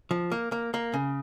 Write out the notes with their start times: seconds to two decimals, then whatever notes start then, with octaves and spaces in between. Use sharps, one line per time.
0.11 F3
0.32 A#3
0.52 A#3
0.74 A#3
0.94 C#3